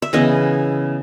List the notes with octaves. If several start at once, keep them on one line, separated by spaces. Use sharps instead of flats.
E5
C#3 E3 B3 E4 D#5